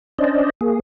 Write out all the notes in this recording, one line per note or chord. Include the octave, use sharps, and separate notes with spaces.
C#4 D4 C5 D5 D#5
A#3 G#4